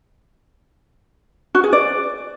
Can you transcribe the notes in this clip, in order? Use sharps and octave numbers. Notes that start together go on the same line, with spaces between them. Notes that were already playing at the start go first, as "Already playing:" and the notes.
F#4
G#4
D5